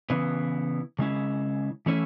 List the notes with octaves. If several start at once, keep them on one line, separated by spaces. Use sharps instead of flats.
C#3 E3 B3
C#3 G#3 C#4 E4
E3 A3 C#4 E4